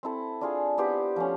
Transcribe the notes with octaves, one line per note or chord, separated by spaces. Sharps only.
C4 E4 A4
D4 F4 G#4
B3 E4 G4 C5
F3 A3 C#4